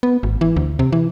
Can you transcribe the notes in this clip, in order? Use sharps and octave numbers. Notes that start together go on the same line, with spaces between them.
B3
G#1
E3
D2
C3
E3